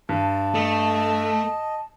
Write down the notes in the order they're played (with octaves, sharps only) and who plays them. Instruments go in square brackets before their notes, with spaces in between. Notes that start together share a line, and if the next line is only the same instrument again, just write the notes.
[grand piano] G2 [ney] A5
[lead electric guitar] A3 [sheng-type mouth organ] D#5